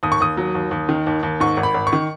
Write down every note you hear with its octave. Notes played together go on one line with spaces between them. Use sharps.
D#2 D#6
C#6
D#2 D#6
F#3
D#2
D#2
D#3
D#2
D#2
G#2 C#6
G#1
B5
G#1
C#6
D#3